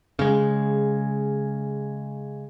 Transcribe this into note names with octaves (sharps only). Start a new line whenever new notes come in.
C#3 G#3